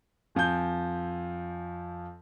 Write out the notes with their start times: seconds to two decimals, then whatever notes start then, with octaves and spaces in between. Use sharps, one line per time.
0.35 F2 F3 G#5 G6